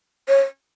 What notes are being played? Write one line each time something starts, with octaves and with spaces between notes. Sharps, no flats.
C#5